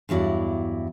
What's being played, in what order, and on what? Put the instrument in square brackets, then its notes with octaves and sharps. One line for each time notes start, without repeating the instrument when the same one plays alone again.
[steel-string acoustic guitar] E2 G2 F#3 E4 D5